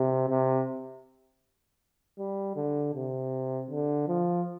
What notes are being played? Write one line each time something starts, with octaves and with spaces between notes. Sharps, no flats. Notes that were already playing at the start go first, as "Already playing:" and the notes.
Already playing: C3
C3
G3
D3
C3
D3
F3